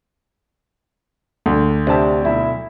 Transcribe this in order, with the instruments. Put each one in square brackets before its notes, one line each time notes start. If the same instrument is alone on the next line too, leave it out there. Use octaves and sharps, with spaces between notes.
[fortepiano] D2
[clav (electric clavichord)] C3 G4 E5 [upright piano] D4 A5
[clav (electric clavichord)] B1 [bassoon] E4